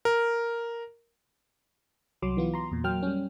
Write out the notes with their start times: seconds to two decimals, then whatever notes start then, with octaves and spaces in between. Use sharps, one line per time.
0.05 A#4
2.22 C2 F#3 C6 D6
2.37 E3 B3 F4
2.54 A#5 C6
2.71 E2 A#2
2.84 F#3 A#3 G5 F6
3.03 G3 C#4